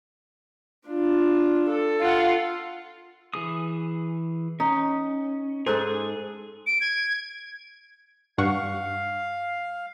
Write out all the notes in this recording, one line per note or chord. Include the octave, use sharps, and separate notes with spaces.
D4 F4
A4
F4 F#5
E3 G#4 D#6
C#4 D#4
G#2 G#4 A4 C5 F#6
D7
G#6
G2 F5 F#5 C#6